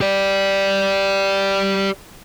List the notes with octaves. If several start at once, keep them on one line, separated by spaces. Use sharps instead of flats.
G4 D5